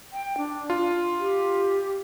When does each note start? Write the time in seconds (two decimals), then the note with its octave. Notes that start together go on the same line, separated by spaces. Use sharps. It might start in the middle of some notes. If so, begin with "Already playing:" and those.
0.13 G5
0.38 D4
0.70 F4
1.19 G4